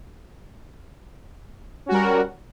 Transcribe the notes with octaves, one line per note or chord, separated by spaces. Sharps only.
G3 C#4 F#4 A#4